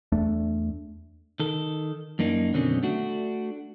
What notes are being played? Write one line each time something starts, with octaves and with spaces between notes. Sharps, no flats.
E2 A3 D4
D#3 A4
F#2 A#3 D4 D#4
F#2 B2 D3 D#3 C4 C#4
A3 D4 F#4